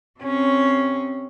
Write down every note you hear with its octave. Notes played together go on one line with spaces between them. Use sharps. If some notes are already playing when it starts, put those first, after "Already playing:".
C3 C#4